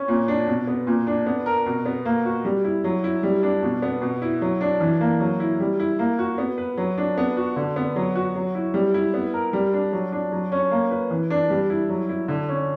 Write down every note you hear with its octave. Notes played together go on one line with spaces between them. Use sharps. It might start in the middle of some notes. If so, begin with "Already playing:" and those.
Already playing: C#4
A#2
D4
B2
B3
A#2
D4
B3
A#4
B2
B3
A#3
F#4
G3
E4
F#3
E4
G3
D4
B2
B3
B2
E4
F#3
D4
E3
A#3
F#3
E4
G3
E4
A#3
F#4
B3
B4
F#3
D4
B3
F#4
D3
B3
F#3
F#4
F#3
E4
G3
E4
B3
A#4
G3
D4
F#3
D4
F#3
C#4
A#3
B4
E3
D4
G3
E4
F#3
E4
D3
C#4